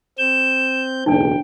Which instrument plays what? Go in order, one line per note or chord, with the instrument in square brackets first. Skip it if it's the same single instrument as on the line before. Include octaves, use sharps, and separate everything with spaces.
[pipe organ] C4 G6 [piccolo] E7
[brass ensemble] F#1 B1 E2 [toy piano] D4 D#4 [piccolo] G5